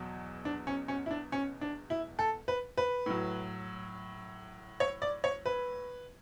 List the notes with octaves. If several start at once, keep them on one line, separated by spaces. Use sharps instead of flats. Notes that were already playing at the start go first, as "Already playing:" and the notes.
Already playing: E2 B2 F#3
D4
C#4
C#4
E4
D4
C#4
D4
E4
A4
B4
B4
A2 F#3
C#5
D5
C#5
B4